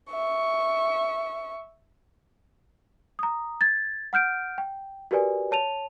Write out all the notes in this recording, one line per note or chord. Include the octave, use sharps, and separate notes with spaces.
E5 C#6
A#5 D#6
G#6 A6
F#5 F6 G6 D7
G5
F#4 G4 A#4 B4 D5 G#5
C#5 A5 D#7 F7